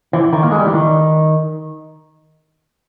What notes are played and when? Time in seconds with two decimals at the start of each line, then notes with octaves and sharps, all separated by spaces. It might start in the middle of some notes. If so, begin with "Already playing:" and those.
0.13 E3
0.33 D#3
0.43 A#3
0.51 G#3
0.58 G3
0.66 E3
0.74 D#3